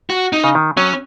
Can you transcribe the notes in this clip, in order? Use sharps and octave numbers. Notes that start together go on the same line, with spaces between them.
F#4
D#4
C#3
D#3
F#3 C#4